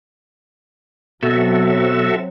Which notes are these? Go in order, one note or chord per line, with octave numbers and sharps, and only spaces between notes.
B2 F#3 C4 F#4 A4 E5